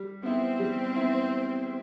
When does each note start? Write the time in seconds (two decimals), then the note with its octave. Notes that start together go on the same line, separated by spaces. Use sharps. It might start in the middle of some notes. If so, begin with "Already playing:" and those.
Already playing: G3
0.23 B3 C4 E4
0.59 G3
0.96 B3 E4